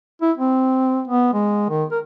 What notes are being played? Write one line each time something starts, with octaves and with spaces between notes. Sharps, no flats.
E4
C4
B3
G#3
D#3
A#4